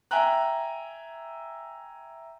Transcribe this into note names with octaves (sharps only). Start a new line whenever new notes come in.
E5 G5 G#5 A#5 F#6